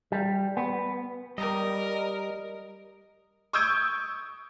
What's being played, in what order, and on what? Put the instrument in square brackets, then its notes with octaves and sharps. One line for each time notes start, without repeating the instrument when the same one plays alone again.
[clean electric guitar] G3
B3
[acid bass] G3 [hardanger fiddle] A#4 [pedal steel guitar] D#5
[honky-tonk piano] C#6 D#6 E6 G6 G#6 D7